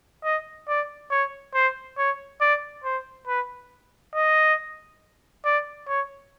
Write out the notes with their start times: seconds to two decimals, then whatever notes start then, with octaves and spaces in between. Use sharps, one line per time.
0.24 D#5
0.68 D5
1.11 C#5
1.54 C5
1.98 C#5
2.41 D5
2.84 C5
3.27 B4
4.15 D#5
5.45 D5
5.88 C#5